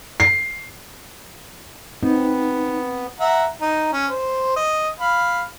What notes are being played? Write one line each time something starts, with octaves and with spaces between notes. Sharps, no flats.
C7
B3 C4 D#4
E5 F#5 A#5
D#4
C#4
C5
D#5
F5 B5